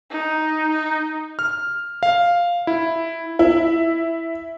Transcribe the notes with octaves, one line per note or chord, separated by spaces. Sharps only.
D#4
D#4
F6
F5
E4
E4